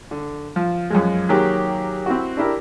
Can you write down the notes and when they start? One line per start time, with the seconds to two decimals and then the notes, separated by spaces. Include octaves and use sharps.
0.11 D3
0.56 F3
0.90 F#2 F3 G#3
1.29 D#3 F#3 A#3 G4 G#4
2.06 C4 E4 F#4
2.37 D4 E4 G4 A#4